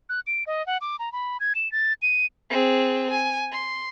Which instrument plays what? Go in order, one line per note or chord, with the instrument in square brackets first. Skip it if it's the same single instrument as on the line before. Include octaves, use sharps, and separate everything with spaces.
[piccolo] F#6
D7
D#5
F#5
D6
A#5
B5
G#6
E7
A6
D#7
[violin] C4 G#4
G#5
C6